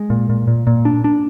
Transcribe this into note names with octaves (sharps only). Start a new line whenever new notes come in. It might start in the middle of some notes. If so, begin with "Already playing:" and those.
Already playing: G#3
A#2
A#2
A#2
A#2
D4
D4